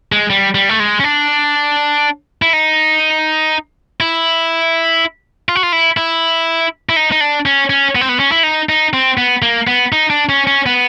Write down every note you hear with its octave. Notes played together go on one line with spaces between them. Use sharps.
G#3
G3
G3
A3
G#3
C#4
D4
E4
D#4
E4
F4
F#4
F4
E4
E4
E4
D#4
D#4
D4
C#4
C#4
B3
C4
B3
C#4
E4
D#4
D#4
C4
B3
A#3
B3
D#4
D4
C#4
C#4
B3